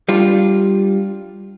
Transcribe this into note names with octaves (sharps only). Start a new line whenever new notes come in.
G3 D4 F4